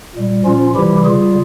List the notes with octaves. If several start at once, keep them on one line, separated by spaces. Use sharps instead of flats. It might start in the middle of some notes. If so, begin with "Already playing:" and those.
A#2 G3
A#2 F3 C#4 F4
C3 E3 G3 E4 G4
C#3 G3 F4 G#4